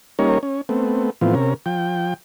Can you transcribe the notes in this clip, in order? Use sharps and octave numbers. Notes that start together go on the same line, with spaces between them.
G3 A#3 C#4 D#4 A#4 C#5
C#4
A3 B3 C4
A2 E3 F3 B3 C4 F4
C3 C#4 A#4
F3 G5